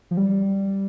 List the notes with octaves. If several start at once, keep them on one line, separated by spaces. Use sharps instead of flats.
F3
G3